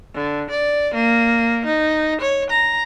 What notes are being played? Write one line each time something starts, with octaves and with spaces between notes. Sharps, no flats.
D3
D5
A#3
D#4
C#5
A#5